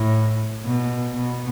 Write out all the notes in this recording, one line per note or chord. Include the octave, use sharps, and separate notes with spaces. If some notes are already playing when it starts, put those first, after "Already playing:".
Already playing: A2
B2
B2